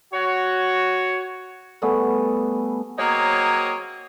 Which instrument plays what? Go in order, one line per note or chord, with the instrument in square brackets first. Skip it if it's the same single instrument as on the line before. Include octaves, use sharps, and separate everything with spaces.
[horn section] F#4 C#5
[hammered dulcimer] G3 A3 B3 G#4
[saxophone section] F#3 A#3 C4 G#4 C#5 D#5